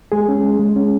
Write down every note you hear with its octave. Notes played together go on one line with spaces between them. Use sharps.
G#3 G#4
C#4
G#3
G#3
C#4